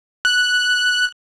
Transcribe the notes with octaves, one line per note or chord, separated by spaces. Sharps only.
F#6